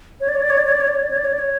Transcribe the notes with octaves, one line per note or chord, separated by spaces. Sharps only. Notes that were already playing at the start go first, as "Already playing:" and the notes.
C#5
D5
C#5
D5
C#5
D5
C#5
D5
C#5
D5
C#5
D5
C#5
D5
C#5
D5
C#5